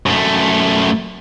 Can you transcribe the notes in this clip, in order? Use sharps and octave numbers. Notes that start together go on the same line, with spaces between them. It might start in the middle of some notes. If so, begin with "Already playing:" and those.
F#2 A3